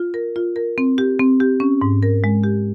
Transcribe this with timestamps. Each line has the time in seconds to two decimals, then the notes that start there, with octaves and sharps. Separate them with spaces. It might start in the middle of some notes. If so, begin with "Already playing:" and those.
Already playing: F4
0.14 A#4
0.36 F4
0.56 A#4
0.78 C4
0.98 G4
1.19 C4
1.40 G4
1.60 C#4
1.81 G#2
2.03 A#4
2.24 G#3
2.44 G4